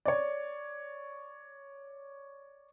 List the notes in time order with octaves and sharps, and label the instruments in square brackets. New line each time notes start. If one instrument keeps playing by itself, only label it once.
[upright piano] C#5 D5